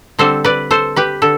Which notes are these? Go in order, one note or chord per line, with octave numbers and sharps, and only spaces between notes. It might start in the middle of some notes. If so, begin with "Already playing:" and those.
D3 G3 C4 A4 C5
B4 D5
A4 C5
G4 B4
D3 A4